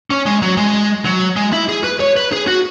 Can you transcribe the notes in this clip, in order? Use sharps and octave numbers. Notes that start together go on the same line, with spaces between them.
C#4
G#3
F#3
G#3
F#3
G#3
E4
G#4
B4
C#5
B4
G#4
F#4